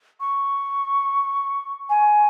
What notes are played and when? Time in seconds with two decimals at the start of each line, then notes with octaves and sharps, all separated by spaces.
0.20 C#6
1.90 G#5